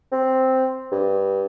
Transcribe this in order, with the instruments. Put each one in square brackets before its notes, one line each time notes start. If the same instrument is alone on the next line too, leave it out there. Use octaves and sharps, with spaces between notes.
[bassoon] C4
G2